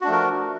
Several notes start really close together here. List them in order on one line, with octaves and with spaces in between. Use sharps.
F#4 D4 A3 F3 A#4